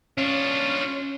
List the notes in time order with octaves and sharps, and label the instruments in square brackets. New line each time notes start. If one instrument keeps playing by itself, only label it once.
[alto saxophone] C#4 [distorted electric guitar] D4 F4